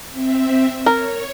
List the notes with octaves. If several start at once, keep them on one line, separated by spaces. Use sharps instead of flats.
C4 E5
A#4 C#5